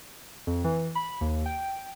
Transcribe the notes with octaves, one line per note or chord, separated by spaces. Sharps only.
F2
E3
B5
D#2
G5